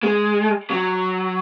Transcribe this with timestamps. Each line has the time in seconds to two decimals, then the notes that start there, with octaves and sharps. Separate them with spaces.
0.03 G#3
0.70 F#3